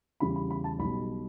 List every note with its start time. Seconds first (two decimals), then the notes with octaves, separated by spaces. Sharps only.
0.20 E2 C#3 G3 B5
0.36 B5
0.51 B5
0.64 A5
0.79 B1 B2 G3 B5